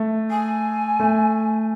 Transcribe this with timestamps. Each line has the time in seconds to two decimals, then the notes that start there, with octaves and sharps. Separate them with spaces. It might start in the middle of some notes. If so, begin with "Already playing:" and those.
Already playing: A3
0.30 G#5
1.00 A3